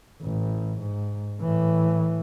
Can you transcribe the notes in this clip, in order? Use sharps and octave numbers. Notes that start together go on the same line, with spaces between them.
A1
G#2
A2 E3